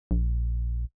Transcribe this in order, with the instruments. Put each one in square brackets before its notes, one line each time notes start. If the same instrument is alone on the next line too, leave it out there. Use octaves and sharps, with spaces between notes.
[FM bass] A#1